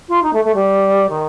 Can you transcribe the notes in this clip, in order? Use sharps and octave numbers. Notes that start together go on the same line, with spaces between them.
F4
D#4
A3
A3
G3
D#3